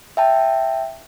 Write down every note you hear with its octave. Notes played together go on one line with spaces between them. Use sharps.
E5 G5 A5